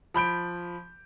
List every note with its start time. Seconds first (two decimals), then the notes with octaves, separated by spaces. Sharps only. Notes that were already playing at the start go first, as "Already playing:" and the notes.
0.14 F3 B5 G6 D7